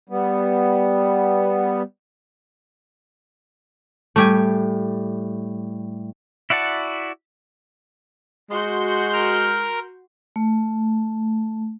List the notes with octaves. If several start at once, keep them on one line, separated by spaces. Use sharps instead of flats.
G3 B3
A2 G3 A3 G4 G#5
E4 F#4 D5 F#5 A5
G#3 F#4 C6 G6
A#4 F6
A3